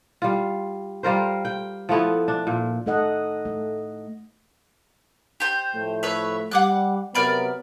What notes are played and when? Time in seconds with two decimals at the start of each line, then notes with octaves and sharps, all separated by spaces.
0.22 G3 F4
1.03 G3 F4 A#4 C5
1.45 G5
1.89 F3 A3 B3 E4
2.28 D4
2.47 A#2
2.86 A3 D#4 A4 D#5 F#5
3.45 A3
5.40 G4 C5
5.74 A2 F3 A3
6.03 B4 C#5 E5
6.51 G3 F#5 D6 F#6
7.15 C3 F#3 B3 A#4 D5 B5